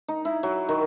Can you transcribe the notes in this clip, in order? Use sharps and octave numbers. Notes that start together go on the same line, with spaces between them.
D#4
E4
F#3
D#3